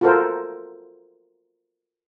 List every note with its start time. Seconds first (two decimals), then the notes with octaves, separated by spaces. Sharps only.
0.01 F4 F#4 A4 A#4 C5